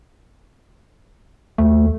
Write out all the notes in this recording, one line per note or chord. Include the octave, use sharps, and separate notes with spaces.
D#2 A3